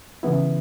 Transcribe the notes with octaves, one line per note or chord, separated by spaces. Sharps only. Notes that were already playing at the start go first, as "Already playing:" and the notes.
C#3 E3 B3 E4